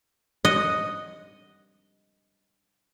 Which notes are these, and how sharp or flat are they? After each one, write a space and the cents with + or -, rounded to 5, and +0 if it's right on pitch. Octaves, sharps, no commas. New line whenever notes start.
D#5 +0 F#5 +0